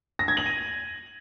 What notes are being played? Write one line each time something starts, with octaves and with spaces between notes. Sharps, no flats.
A#6
G#6
F#7
D#7